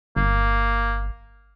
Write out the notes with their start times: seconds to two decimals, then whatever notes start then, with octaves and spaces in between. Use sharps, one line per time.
0.17 G1 A#3